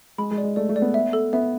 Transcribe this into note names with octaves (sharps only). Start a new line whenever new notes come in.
G#3 B5
G#3
D5
G#3
A3 D5
A3
D5
B3
E5
A4
B3 E5